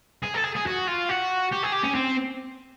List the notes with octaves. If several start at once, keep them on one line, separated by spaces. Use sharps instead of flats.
G#4
A4
G#4
G#4
F#4
F4
F#4
G4
G#4
G4
C#4
C4